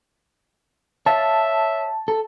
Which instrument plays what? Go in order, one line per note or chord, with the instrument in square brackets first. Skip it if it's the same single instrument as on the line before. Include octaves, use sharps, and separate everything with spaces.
[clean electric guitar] C#5 F5 [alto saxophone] E5 [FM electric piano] A5
[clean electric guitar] A4